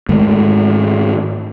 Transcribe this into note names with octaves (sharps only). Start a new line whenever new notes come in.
G#2 D#3 G#3 A3